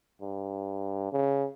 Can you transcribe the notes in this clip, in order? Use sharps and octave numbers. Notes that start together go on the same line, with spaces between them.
G2
C#3